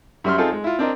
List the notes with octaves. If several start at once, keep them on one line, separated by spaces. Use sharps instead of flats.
F#2 G3 E5 C6 F6
C4 D#4 F4 G#4 A4
G#3
E4 F4
C4 D4 A#4 D#5